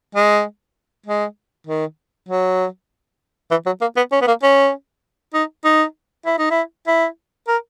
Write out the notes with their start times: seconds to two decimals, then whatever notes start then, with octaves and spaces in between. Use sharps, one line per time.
0.15 G#3
1.06 G#3
1.67 D#3
2.29 F#3
3.51 E3
3.66 F#3
3.81 A#3
3.97 B3
4.12 C#4
4.22 B3
4.27 A#3
4.43 C#4
5.34 D#4
5.65 D#4
6.26 E4
6.38 D#4
6.51 E4
6.87 E4
7.47 A#4